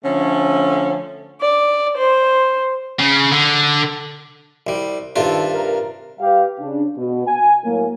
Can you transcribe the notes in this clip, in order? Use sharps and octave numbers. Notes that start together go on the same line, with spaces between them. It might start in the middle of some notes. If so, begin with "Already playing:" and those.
D3 F3 A3 C#4
D5
C5
C#3
D3
C2 G3
G2 C3 D#3 F4 A4
A#4
G3 G4 B4 F5
C#3 D4
B2
G#5
A2 F#3 A#3